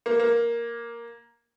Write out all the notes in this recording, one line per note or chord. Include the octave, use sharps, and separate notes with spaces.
A#3
A#3